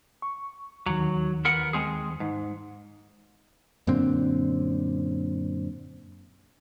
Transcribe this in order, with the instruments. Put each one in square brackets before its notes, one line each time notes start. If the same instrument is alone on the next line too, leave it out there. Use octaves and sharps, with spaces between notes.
[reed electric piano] C#6
[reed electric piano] D#2 D#3 [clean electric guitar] F#3
[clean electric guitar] B3 A#4 F#5
G#3 C4 G#4
G#2
[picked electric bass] F#2 A#2 D3 C4